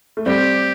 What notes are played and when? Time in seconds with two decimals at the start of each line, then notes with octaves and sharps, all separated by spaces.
0.17 A3
0.26 G3 C4 G4